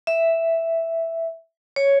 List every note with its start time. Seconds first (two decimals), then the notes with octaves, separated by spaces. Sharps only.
0.07 E5
1.76 C#5